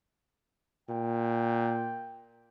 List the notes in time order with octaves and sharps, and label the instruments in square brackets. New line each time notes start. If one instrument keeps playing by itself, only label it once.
[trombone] A#2 [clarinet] G5